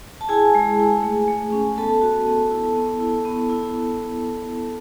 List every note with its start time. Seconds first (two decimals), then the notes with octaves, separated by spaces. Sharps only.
0.21 A5
0.29 E4 G#4 G#5
0.55 G#3
0.79 E4
1.03 A3
1.28 A3
1.52 C#4
1.78 B3 A4 A5
2.02 F#4
2.27 B3
2.51 E4
2.76 B3
3.00 E4
3.25 B3
3.50 E4